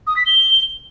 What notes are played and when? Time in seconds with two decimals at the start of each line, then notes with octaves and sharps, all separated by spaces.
0.07 D#6
0.17 B6
0.26 G7